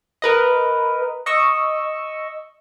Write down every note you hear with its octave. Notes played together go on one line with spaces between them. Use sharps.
A#4 B4 D#5
D#5 C#6 E6